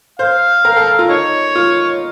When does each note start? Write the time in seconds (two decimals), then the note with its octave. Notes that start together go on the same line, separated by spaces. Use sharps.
0.19 C5 F5
0.65 A#4
0.76 A4
0.87 A4
0.99 F4
1.09 D#4 C#5
1.55 F4